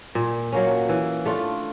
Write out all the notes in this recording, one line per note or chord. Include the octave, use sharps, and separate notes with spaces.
A#2
F#3 A#3 C#4
E3
A3 D4 F4